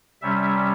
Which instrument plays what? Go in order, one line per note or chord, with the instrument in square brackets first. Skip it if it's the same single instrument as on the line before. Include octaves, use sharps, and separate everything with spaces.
[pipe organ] C3 G3 C#4 E5